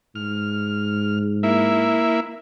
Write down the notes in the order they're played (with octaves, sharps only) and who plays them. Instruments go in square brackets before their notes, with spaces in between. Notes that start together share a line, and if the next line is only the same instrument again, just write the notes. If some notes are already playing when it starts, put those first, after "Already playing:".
[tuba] G#2 [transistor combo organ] F6
[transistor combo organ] A#3 E4 E5